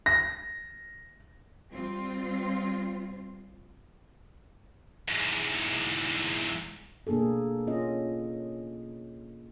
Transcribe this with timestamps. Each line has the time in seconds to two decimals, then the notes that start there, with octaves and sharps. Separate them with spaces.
0.06 A#6
1.72 G3 C4 F4
5.08 E2 G#2
7.07 B2 A#3 D4 G#4 A4
7.67 C#4 F4 D#5